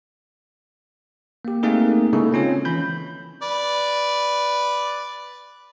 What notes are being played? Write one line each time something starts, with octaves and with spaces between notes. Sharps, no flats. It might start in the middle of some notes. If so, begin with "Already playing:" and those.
A#3 G4
A3 A#3 C4 D#4 G#4 A#4
C#3 G#3 A#3 D#4 E4 A4
C4 C#4 F4 C#5
E3 C#4 B5 G6
B4 D5